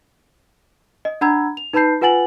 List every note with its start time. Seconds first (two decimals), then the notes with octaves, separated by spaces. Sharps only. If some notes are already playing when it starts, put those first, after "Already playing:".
1.05 D#5
1.21 D4 F#5 A#5 B5 E6 G#6
1.57 F7
1.73 D#4 B4 A5 B5 G6 C7
2.01 F4 B4 F#5 G#5 A6 F#7